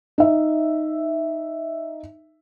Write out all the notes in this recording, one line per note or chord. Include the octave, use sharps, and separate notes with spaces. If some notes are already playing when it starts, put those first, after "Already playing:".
D#4 E5